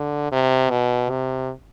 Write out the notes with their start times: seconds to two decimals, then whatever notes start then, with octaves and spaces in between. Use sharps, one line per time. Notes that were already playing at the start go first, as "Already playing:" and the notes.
Already playing: D3
0.32 C3
0.70 B2
1.09 C3